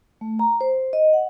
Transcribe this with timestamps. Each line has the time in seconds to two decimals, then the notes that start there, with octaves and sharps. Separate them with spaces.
0.21 A3
0.39 A#5
0.61 C5
0.93 D#5
1.13 F#5